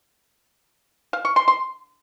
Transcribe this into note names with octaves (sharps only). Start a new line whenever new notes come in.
F5
C#6
C6
C6